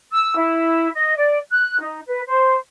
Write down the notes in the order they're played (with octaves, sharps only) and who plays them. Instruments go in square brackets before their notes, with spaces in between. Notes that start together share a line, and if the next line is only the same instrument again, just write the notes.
[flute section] E6
E4
D#5
D5
F#6
D#4
B4
C5